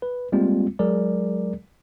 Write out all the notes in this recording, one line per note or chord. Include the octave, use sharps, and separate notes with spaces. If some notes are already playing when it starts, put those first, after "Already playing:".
B4
G3 G#3 A#3 C4 F4
F#3 G#3 G#4 A#4 D5